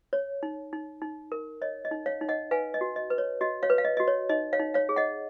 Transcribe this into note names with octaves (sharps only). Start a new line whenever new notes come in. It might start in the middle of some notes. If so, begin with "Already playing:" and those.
C#5
D#4
D#4
D#4
A#4
C#5 D#5
D#5
D#4
C#5 F5
D#4
D#5 F#5
B4 F5 G#5
D#5
F#4
D#5
B4
C#5
F#4 D#5
C#5 F5
B4
F5
D#5
F#4 D#5
C#5
D#4 D#5
C#5 F5
D#4
C#5 F5
G#4
D#5 F#5